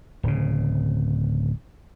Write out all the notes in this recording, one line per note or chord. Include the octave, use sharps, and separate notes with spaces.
D1 C#3